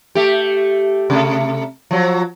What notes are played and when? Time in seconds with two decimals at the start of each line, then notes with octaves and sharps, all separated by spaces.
0.15 A3 G4
1.10 C3 A3
1.91 F3 F#3